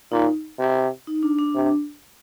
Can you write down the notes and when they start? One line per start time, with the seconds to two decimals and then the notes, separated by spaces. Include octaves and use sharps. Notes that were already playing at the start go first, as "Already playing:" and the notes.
0.12 A#2 D#4
0.59 C3
1.07 D#4
1.23 D4
1.39 D4
1.55 C3